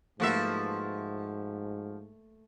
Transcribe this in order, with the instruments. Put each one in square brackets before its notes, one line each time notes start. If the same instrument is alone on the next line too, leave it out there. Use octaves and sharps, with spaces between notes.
[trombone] G#2 [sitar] F3 F#4 E5 [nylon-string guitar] A3 A#3 B4